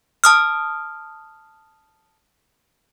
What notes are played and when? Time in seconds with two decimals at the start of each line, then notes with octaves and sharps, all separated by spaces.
0.24 A5 D#6 F6